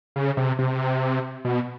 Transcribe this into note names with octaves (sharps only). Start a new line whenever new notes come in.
C#3
C3
C3
B2